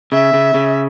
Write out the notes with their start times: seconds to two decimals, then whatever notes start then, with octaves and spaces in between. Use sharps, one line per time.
0.12 C#3 E5
0.33 C#3
0.54 C#3